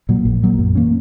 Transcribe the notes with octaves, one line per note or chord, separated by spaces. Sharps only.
A#2 F#3 A#3
A#1
A#2 F#3 A#3
F#2
E3 A#3 C#4